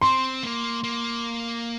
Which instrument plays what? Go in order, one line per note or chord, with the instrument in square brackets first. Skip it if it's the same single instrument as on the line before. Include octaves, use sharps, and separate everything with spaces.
[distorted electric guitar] C4 [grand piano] C6
[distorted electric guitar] A#3
A#3